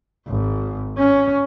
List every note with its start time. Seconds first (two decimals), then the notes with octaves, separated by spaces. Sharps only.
0.28 G#1
0.98 C#4